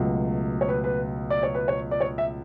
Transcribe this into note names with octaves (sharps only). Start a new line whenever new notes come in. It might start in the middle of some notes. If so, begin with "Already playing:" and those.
Already playing: C#2 B2 F#3 A3
C#5
B4
B4
D5
C#5
B4
C#5
D5
C#5
E5